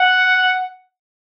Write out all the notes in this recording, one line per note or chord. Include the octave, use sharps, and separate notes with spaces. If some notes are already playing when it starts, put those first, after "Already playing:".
Already playing: F#5